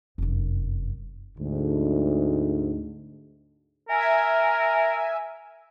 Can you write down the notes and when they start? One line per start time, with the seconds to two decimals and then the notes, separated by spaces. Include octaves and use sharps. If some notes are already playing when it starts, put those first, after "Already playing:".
0.18 F1 F#2
1.38 D2 G#2
3.89 A#4 E5 G#5